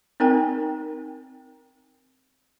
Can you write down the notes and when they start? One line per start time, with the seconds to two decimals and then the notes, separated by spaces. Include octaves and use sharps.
0.20 C4 D#4 A#4 G5 G#5